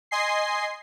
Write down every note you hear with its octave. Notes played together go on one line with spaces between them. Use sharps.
D#5 G#5 C6 C7